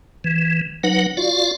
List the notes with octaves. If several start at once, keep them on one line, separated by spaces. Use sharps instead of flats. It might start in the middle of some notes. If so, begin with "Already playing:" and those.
E3
F#3 D#4 B4 F#5
F4 F#4 D5 F5